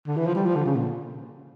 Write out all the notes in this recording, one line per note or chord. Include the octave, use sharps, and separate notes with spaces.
D3
E3
F3
G3
F3
D3
C#3
A#2